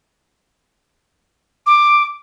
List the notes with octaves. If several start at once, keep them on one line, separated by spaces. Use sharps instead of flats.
D6